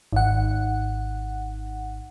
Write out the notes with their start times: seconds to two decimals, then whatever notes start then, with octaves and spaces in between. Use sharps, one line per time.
0.13 G#1 F#5